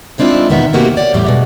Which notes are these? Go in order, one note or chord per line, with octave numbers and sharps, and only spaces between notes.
D#3 G#3 C4 D4 E4 F4
E2 B2 D#3 B3 E5
C3 D#3 A#3 B3 F#4 G4
C#5 D5 F5 F#5
E2 A2 G3 G4
B2 G#3